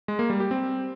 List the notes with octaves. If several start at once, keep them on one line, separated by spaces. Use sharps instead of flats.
G#3
A#3
G3
G4
C4